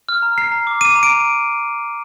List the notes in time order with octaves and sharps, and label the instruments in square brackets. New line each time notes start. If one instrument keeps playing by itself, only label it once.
[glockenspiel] F6
A#5
A#5 C7
A#5
D6
D6 D#7
A#5
D7
A#5